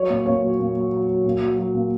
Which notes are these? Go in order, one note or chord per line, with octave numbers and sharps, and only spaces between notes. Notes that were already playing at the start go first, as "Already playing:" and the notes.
Already playing: F#3 C#5
A#2
A#2 C#5
F#3
A#2
F#3
F#3
F#3
A#2
F#3
F#3
A#2